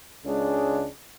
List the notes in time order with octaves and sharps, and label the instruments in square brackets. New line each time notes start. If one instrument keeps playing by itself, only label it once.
[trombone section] C#2 C#3 G#3 D4 G#4